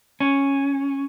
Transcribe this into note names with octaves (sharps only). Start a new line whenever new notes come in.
C#4